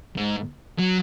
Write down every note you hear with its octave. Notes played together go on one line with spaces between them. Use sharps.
G#2
F#3